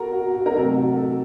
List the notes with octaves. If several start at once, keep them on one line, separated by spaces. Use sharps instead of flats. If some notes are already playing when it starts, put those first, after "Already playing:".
Already playing: F#4 A4 A#4
F#4
F#4
A#4
C3 F#3 A3 D#4 A4
F#4
A4